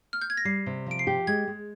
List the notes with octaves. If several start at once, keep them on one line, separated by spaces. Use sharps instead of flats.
F6
G6
G#6
A#6
G3 C7
C3
F3 D7
C7
G4
G#3 G#6
G#3